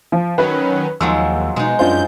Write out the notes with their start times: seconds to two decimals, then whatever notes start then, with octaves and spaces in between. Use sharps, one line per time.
0.12 F3
0.38 D#3 F#3 C#4 B4
1.01 D#2 F3 F#3 G#3 E6
1.56 B2 G#3 D#4
1.79 F#2 D4 F4 C5 G6